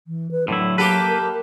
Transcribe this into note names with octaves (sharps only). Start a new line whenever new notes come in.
E3
B4
A2 D3 F#3 E4
A#3 G4 A4 B4
A#4